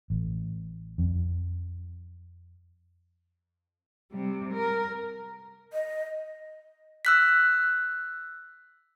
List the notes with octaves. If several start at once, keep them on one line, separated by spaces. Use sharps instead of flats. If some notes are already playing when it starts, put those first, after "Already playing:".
A1
F2
C3 G3
A#4
D#5
E6 F#6 B6